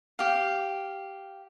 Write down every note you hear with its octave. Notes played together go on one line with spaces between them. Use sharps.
G4 F5